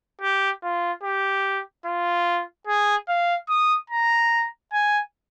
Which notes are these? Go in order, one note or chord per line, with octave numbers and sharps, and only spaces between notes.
G4
F4
G4
F4
G#4
F5
D#6
A#5
G#5